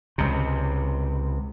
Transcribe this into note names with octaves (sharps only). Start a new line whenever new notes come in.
C#2 C3